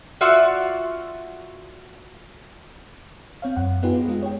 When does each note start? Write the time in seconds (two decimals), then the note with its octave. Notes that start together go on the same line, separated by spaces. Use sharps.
0.21 F4 F#4 D5 E5 F#5
3.42 C4 C#5 F5
3.57 F#2 F#5
3.83 B3 D#4 F4 G4 G#4 B4
4.08 G#3 D#4 F4
4.22 C#5 G5